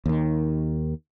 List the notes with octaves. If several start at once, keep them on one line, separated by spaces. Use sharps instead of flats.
D#2 D#3